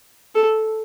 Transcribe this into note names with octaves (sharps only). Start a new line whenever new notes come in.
A4